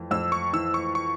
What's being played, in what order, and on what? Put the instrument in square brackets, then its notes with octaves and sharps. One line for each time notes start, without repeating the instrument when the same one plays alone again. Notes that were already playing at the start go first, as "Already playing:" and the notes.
Already playing: [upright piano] F2 E3
[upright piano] F2 [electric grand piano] E6
[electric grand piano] C#6
[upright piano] E3 [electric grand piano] E6
[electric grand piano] C#6
C#6